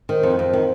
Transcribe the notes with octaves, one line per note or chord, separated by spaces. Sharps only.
D#3 C5
F2
F2
D#3